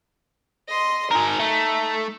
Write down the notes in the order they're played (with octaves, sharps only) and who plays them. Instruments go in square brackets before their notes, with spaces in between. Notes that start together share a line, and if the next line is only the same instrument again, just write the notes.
[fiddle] D#5 C6
[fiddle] D#4 [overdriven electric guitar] G#4 A#4
[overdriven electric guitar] A3